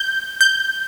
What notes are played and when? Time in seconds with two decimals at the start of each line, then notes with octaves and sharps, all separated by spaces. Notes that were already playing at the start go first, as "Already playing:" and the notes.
Already playing: G6
0.41 G6